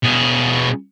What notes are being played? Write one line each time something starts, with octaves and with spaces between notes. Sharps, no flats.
B2 G#4